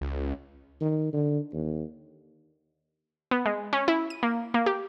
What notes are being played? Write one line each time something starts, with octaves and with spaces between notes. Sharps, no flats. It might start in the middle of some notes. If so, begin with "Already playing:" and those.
C#2
D#3
D3
D#2
B3
G#3
C#4
E4
D#7
A#3
A#3
G4